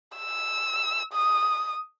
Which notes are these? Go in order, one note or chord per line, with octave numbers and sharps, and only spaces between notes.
E6
D#6